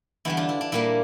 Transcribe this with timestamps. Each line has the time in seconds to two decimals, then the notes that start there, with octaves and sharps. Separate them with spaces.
0.25 E2 D3 G3 E4
0.37 D4 F4
0.49 E4
0.61 D4
0.72 A#2 G3 A#3 E4